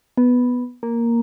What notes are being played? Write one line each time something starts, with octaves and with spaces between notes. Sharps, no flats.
B3
A#3